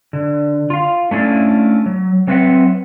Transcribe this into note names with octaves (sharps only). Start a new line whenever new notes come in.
D3
F4 F5
A3 C#4 D4 E4 F4
F#3
F#3 C4 B4 C5 E5 F#5